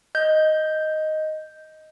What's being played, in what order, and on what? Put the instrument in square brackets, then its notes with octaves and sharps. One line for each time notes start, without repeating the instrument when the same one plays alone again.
[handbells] D#5 G6